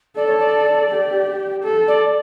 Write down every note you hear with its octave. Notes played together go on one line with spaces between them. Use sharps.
A4 D5
C#5
D5
G4
A4
D5